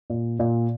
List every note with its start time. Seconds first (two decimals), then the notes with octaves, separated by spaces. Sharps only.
0.10 A#2
0.39 A#2